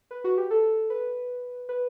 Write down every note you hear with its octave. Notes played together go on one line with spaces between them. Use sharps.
B4
F#4
G4
A4
B4
B4